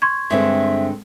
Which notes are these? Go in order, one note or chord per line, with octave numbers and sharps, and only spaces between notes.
C6 C#6 G#6
G2 D3 G#3 C4 D4 E5